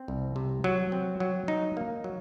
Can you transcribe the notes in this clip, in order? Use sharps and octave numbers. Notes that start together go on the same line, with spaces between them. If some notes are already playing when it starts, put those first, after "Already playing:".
Already playing: C4
C2
C3
F#3
C4
F#3
D#4
A#3
F#3